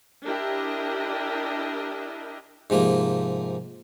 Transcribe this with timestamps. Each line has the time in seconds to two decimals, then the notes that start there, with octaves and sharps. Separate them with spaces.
0.24 D4 E4 G4 A#4 D#5
2.70 G#2 C3 F3 A#3